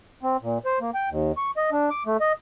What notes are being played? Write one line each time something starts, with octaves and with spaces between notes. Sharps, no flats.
C4
A#2
C5
A#3
G5
D#2
C#6
D#5
D4
D6
A3
D#5